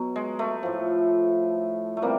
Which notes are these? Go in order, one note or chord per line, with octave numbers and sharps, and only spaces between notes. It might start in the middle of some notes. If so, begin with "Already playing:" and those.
Already playing: B2 F#3
G#3
A3
A2 F3
A3
C3 E3 G3 A#3